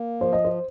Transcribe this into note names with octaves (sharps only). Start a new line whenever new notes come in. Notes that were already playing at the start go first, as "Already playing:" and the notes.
Already playing: A#3
F3 C5
D#5
C5